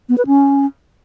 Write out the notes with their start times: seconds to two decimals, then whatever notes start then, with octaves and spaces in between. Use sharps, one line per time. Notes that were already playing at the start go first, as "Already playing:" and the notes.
0.09 B3
0.18 B4
0.27 C#4